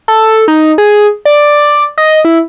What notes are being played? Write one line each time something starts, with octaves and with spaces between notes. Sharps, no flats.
A4
D#4
G#4
D5
D#5
E4